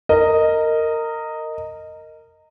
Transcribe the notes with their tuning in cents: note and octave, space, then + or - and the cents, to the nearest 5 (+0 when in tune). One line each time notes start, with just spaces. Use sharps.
A#4 -20 D#5 +0